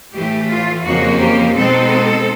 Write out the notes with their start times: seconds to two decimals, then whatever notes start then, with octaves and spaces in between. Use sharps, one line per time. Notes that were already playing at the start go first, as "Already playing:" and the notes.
0.13 A2 E3 A3 G4
0.49 F4
0.85 F2 C#3 F3 A#3 D#4 F#4
1.20 G4
1.56 B2 G#3 C4 D#4 A4